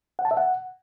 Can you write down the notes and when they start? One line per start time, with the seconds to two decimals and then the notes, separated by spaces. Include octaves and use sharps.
0.19 F#5
0.25 A5
0.31 E5
0.37 F#5